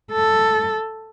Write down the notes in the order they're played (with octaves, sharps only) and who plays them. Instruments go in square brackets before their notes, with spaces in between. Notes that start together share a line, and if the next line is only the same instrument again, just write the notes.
[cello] A4